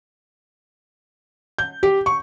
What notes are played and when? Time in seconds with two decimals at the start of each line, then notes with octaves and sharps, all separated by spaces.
1.58 G6
1.83 G4
2.06 C#6